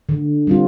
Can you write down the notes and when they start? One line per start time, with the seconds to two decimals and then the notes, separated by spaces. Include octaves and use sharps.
0.09 D3
0.47 G3 C4 F4